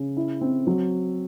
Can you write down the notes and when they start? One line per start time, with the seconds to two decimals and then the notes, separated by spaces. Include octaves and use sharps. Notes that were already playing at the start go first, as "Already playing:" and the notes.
Already playing: C#3
0.17 E4
0.41 C4
0.67 F#3